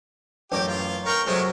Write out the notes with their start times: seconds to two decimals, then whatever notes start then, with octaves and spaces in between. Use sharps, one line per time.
0.52 A1 F#2 G4 D6
0.68 F4
1.06 A#4 F5 G5 A#5 C#6
1.27 F#2 C3 G#3 A3 F#4